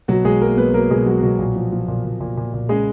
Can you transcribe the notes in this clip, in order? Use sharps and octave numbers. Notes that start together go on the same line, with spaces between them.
B2 F#3 F#4
B2 G#3 G#4
F#3 A#3 A#4
F#3 B3 B4
F#3 A#3 A#4
B2 G#3 G#4
F#3 F#4
B2 F#3 F#4
A#2
F3
F3
A#2
A#2
A#2
A#2
A#2
C#3 G#3 G#4